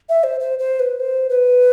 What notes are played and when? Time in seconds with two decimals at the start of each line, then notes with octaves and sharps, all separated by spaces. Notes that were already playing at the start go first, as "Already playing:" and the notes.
0.09 E5
0.24 C5
0.40 C5
0.59 C5
0.80 B4
1.00 C5
1.30 B4